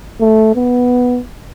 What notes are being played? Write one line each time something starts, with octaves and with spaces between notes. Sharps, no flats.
A3
B3